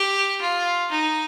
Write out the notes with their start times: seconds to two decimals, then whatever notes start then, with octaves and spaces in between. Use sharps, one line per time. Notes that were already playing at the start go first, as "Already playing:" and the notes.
Already playing: G4
0.41 F4
0.91 D#4